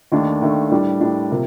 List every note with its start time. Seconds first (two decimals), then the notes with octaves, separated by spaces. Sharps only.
0.12 D#2 D#3 A3 D4
0.42 D#2 D#3 A3 D4
0.71 A2 G3 D4
1.01 A2 G3 D4
1.31 C3 F3 A#3